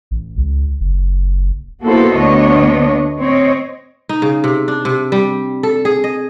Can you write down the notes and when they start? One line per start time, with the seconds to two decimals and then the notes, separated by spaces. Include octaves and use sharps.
0.11 A1
0.37 C#2
0.80 F#1
1.83 A#3 B3 E4 F#4 A4 C5
2.16 D2 B3 D4 C#5 D#5
3.19 C4 C#5 D#5
4.09 D#4
4.22 C#3
4.44 C3
4.68 D4
4.85 C3
5.12 G3
5.63 A4
5.85 G#4
6.04 D#5